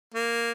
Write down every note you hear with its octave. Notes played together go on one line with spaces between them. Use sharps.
A#3